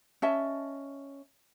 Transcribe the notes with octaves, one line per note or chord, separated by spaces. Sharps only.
C#4 D#5 E5 A5